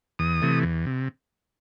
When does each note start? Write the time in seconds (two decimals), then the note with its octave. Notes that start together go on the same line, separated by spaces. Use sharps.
0.19 E2 D#6
0.42 C3 E3 A3
0.63 E2
0.86 C3